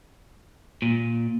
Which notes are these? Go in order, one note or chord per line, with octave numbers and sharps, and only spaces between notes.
A#2